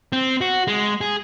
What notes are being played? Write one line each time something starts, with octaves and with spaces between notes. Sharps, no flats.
C4
F#4
G#3
G#4